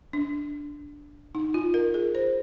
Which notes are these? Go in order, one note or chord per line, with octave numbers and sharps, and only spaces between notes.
D4
D#4
F4
A#4
G#4
C5